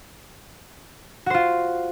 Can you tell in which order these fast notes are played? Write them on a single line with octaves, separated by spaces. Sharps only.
F#4 C5 F4